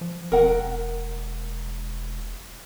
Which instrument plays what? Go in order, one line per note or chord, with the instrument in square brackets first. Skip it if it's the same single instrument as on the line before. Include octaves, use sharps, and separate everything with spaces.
[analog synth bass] F3
[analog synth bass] E1 [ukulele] A#4 F#5